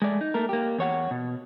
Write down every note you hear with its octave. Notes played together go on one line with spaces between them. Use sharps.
G#3 A3 D5
D#4
A3 A#3 A#4
A#3 G4
E2 C#5 F#5
B2